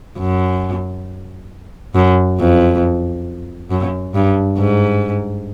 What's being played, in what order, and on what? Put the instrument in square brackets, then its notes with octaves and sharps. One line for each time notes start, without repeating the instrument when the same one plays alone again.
[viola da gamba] F#2
F#2
F2
F#2
G2
G#2